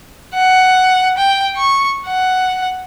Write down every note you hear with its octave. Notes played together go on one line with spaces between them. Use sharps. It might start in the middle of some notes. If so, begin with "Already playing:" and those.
F#5
G5
C#6
F#5